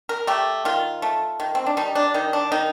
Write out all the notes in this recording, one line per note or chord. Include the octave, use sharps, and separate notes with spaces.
A#4
A3 G4
D#3 F4
A3
D#3
C4
D4
G3 D#4
D4
D#3 D#4
D4
D#3 D#4